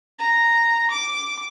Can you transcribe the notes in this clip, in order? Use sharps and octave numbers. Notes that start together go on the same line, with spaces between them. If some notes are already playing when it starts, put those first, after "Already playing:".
A#5
D6